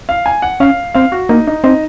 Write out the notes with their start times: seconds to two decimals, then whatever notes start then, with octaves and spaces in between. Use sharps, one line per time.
0.09 F5
0.26 G#5
0.42 F#5
0.60 C#4 F5
0.94 C4 F5
1.12 F#4
1.29 A#3 D#4
1.47 D#4
1.64 C4 D#4